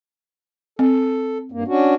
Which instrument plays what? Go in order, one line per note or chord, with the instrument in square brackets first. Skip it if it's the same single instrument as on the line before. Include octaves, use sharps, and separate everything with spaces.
[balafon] C4 [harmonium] A4
[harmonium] G2 A#3
C#4 D4 F#4